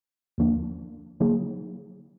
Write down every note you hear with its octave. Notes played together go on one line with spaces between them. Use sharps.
D#2 D3 F3 A#3 D4
D3 F#3 A#3 D#4 G#4